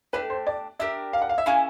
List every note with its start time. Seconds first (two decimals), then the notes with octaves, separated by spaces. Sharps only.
0.13 A3 D4 G4 B4
0.30 C5
0.47 D5
0.79 D4 G4 A#4 E5
1.13 F5
1.22 F#5
1.29 F5
1.38 E5
1.46 A#3 C#4 E4 G#4 F5